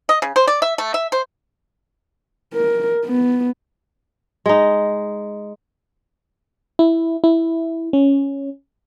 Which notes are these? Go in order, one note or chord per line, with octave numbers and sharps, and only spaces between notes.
D#5
C#3
C5
D5
E5
A3
E5
C5
A#4
B3
G#3 D#4
E4
E4
C#4